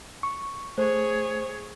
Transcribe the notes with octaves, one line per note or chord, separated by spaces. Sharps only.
C#6
A3 G#4 C5 C#5